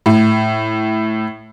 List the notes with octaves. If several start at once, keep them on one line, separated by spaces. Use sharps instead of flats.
A2